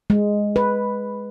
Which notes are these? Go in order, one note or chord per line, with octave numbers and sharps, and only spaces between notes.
G#3
B4